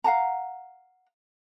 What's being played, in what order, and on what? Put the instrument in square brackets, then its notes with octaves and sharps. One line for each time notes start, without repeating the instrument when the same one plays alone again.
[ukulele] F5 F#5 A5 A#5